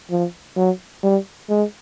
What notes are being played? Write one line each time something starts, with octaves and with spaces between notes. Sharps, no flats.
F3
F#3
G3
G#3